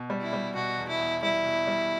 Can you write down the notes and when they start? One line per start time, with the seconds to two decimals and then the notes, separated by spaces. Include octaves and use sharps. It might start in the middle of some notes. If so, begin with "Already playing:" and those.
Already playing: B2
0.10 G3
0.21 E4
0.33 G3
0.55 B2 F#4
0.78 E2
0.88 E4
1.00 E2
1.23 G3 E4
1.45 B2
1.67 G3